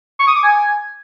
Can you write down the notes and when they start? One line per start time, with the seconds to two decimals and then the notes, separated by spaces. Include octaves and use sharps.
0.19 C#6
0.27 D#6
0.35 D6
0.43 G#5